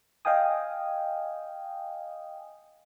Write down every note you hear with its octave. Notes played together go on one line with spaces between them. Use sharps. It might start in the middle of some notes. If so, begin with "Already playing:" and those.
D#5 F5 G5 G#5 D#6